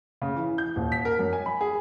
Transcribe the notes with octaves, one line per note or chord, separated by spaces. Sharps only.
C#3
E3
G6
D#1
B6
A#4
F#2
G#5
B5
G#4